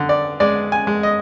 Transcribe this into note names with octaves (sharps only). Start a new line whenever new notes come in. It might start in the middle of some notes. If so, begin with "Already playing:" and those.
Already playing: D3
D5
G#3 D5
G#5
G#3
D#5